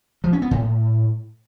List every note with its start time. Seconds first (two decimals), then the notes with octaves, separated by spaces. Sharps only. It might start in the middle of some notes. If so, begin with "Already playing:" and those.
0.24 F3
0.33 C#4
0.42 B3
0.51 A2